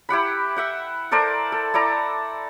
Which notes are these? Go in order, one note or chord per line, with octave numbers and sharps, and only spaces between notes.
E4 G4 F#5 B5
E5 F#5 G5
A4 A#4 C5 D5
A4
E4 A4 D5 A#5